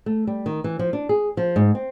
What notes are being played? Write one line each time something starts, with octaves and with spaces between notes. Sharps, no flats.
A3
G3
D#3
E3
F3
D4
G#4
F3
G#2
C4